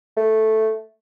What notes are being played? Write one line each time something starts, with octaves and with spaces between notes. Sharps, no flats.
A3